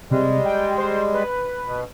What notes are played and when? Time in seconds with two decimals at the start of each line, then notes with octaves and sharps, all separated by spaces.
0.11 C3 G3 G#3
0.45 G5
0.78 C5
1.13 B4
1.66 B2